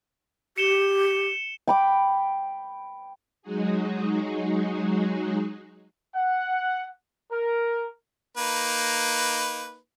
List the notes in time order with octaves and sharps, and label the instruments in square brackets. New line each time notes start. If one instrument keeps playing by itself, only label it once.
[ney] G4 [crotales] C#7 E7 G7
[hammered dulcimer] G5 B5 D6
[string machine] F#3 G#3 D#4 F#4 G#4
[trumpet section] F#5
A#4
[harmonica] A#3 D#4 B4